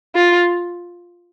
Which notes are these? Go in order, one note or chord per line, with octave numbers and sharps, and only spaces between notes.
F4